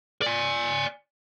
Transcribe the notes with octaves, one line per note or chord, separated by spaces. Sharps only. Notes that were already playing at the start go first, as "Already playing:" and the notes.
D5 G#5